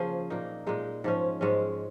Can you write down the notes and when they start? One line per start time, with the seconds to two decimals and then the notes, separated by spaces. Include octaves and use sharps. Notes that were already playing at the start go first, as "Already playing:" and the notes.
Already playing: C#3 F3 A#3 C#4 G#4
0.30 A#2 A#3 D#4
0.67 A#2 G#3 D#4
1.04 G#2 F3 C#4
1.41 G#2 G#3 C#4